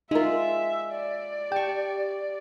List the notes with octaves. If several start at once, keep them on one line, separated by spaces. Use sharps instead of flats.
G#3 D#4 F4 A#4 E5
D5
G4 G5 A5 C#6